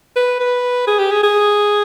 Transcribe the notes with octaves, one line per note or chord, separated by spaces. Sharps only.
B4
B4
G#4
G4
G#4
G#4